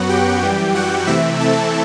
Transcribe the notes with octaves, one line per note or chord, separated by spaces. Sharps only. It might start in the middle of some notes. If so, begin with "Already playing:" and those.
Already playing: F#2 F#3 B3 F#4 F#5
G4 G5
F#2 E3 G3
F#4 F#5
C3 E3 A3 C4 E4 E5
A4 A5